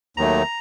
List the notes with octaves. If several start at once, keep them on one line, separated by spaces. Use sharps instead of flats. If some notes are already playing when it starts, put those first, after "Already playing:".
D#2 D#3 F#3 A3 A#5